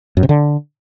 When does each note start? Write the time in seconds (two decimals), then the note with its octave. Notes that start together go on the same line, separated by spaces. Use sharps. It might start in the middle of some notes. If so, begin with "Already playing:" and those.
0.17 F#2
0.23 C3
0.29 D3